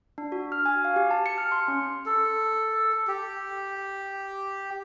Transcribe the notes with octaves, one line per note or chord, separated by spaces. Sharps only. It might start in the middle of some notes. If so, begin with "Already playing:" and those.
D4
F#4
F6
G#5
F5
G4
A5
C#7
F6
C6
C#4
A4
G4